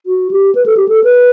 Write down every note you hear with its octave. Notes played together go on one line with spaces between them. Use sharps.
F#4
G4
B4
A4
G4
A4
B4